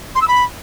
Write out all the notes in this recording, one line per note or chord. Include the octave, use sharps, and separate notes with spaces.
C6
E6
B5